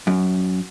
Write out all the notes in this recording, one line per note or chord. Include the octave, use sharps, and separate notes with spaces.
F#2